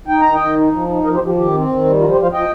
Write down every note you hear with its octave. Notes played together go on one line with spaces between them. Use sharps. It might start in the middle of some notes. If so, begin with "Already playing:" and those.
D#4 G5
D#3 A#5
D#5 G5
D#3
D#4
F3
D#4
F3 A#4 D#5
G4 C5
F3
G4
D#3 G4
C4
D#3
G3
F3 F4 A#4
G4 C5
F3
C5 F5
F3 D#5 G5